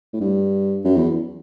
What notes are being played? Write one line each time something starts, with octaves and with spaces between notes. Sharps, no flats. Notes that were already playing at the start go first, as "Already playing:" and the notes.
A2
G2
F#2
E2